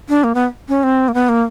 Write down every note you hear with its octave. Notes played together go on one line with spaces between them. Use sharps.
D4
A#3
B3
C#4
C4
A#3
B3
A#3